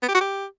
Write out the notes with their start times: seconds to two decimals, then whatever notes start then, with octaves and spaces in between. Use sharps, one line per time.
0.03 B3
0.09 G4
0.15 F#4
0.21 G4